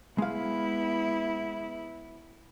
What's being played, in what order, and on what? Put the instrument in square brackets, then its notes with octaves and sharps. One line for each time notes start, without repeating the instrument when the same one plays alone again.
[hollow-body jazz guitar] G#3 F5 [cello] B3 E4